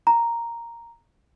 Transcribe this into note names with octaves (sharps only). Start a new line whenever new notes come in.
A#5